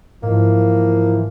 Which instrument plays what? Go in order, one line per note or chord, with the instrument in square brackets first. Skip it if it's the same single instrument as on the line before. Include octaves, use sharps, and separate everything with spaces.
[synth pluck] G#2 [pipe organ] E3 F3 [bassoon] A#3